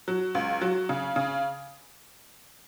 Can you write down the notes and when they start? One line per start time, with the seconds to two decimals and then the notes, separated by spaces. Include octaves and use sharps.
0.08 F#3
0.35 C#2
0.61 F#3
0.89 C#3
1.16 C#3